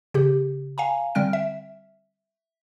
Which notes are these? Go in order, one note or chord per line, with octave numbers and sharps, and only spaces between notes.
C#3 G4
F5 G#5 A#5
D3 G3 C4 F6 D7
E5